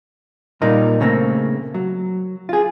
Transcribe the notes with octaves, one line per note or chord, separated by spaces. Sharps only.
A#2 G3 A#3 D#4 A#4
C#3 A3 A#3 C4
F#3
F4 G#4